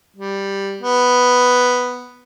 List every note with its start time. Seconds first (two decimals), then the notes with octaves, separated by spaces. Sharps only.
0.16 G3
0.81 B3